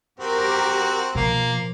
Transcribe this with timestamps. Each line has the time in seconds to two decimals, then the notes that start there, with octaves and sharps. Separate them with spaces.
0.20 C4 F#4 G4 A#4
1.15 B2 F3 A#3